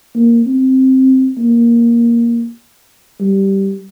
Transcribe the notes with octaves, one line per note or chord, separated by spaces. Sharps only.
A#3
C4
A#3
G3